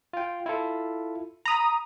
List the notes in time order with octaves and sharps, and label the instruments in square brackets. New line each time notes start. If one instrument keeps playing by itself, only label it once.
[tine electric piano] F4 G5
E4 F4 A4
[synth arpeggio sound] A#5 D#6 [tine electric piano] B5